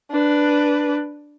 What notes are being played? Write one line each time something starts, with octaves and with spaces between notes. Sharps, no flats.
D4 B4